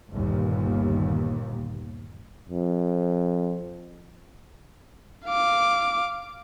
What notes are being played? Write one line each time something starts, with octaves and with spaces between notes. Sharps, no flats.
G1 D#2 A#2
F2
F5 D6